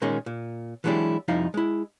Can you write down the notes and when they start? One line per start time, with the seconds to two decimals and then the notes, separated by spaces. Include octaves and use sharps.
0.02 A#2 D#3 G#3 A#3 C#4 G#4
0.26 A#2
0.84 E3 F#3 G#3 D4 E4 G4
1.28 C2 F2 F3 D#4 E4 F5
1.54 G#3 E4